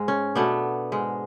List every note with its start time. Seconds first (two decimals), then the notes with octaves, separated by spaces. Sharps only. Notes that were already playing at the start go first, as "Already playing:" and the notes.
Already playing: G#2 G#3
0.08 C#4
0.35 B2 A3 B3 D4
0.92 G#2 G#3